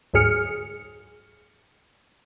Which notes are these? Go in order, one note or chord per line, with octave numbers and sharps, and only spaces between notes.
D2 G#2 F#3 G#4 F6 C#7